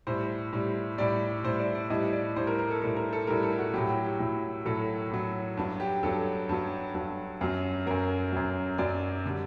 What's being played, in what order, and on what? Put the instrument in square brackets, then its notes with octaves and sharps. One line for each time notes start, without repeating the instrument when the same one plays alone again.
[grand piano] A2 G3 C5
A2 G3
A2 G3 D5
A2 G3 C5
D5
D5
A2 G3 D#5
D5
A2 G3 C5
A#4
A#4
A4
A2 G3 A4
A#4
A4
A2 G3 A#4
A4
F#4
A2 F#3 G4
G4
G4
A2 F#3
A2 F#3 A4
A2 F#3
G2 F#3
G4
G2 F#3 A4
G2 F#3
G2 F#3
F#2 F#3
F#2 F#3 A#4
F#2 F#3
F#2 F#3 D5
D3 G3